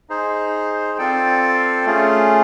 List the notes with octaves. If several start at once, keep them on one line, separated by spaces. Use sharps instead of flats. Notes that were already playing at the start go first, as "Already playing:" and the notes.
D#4 G#4 C5
C4 F4 A4 D5 G5
A3 C#4 F4 G#4